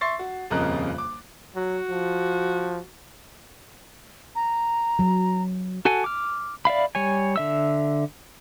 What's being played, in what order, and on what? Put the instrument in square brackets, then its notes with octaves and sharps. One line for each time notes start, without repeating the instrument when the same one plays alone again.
[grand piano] E5 C6 C#6 A6 C7
F#4
D#1 F2 C#3 A#4 D#5 F#6
D6
[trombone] F#3 [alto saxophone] F#4
[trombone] F3
[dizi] A#5
[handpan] F#3
[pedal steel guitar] F#4 A4 F#5 G#5
D6 F6
D5 E5 F5 B5
G3 C#5 G#5
D3 E5 E6